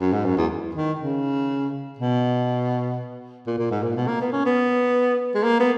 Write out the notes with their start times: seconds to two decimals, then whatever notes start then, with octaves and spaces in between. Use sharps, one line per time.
0.01 F#2
0.13 G#2
0.25 F#2
0.37 E2
0.75 D#3
0.99 C#3
1.99 B2
3.47 A#2
3.59 A#2
3.71 G#2
3.83 A#2
3.96 B2
4.08 A#3
4.21 B3
4.32 C#4
4.46 B3
5.35 G#3
5.44 A#3
5.60 B3